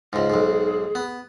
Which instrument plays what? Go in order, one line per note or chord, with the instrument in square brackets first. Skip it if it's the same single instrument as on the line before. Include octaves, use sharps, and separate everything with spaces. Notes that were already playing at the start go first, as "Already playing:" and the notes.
[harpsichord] C#2 G#2 [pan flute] G#4
[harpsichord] B1 G#2
B3